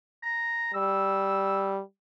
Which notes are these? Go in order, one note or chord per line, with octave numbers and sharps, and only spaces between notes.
A#5
G3 E6